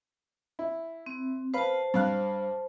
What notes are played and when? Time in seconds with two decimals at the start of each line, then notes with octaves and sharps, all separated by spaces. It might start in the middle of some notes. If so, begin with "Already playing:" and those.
0.59 E4
1.06 C4
1.54 B4 C5 F5 A5
1.94 G2 F5 F#6